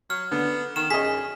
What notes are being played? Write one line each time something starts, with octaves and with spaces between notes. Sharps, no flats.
F#3 F6
D3 B3
D#3 F6 E7
F#2 G#4 D#5 B6